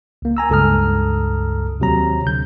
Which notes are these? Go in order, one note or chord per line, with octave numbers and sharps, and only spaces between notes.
C#2 A#3
G#5 A#5 E6
C#2 G2 A4 A#5 D#6 F6
D#2 C3 F#3 A#5
D2 D3 G6